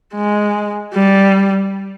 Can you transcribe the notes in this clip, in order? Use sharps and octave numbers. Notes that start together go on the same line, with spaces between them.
G#3
G3